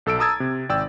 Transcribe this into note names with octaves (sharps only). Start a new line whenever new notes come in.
B1 A4 E6 D7
A5 A#5 D#6 E6 G#6 A6
C3
G#1 D5 G5 E6